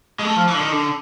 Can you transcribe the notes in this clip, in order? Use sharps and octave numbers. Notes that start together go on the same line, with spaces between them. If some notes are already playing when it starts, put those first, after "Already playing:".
G#3
A3
F3
E3
D3
D#3
D3